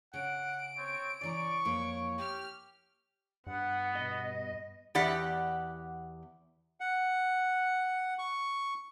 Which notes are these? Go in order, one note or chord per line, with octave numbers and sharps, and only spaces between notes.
C#3 F#5 D7
C4 C#5
C#3 E3 D5 A#5 C#6
F2 E3 A#3 C#5
G4 F6
G2 B3 F#5
B2 D#5
E2 G4 D5 F#5
F#5
C#6